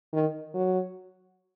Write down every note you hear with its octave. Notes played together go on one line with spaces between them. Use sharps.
D#3
F#3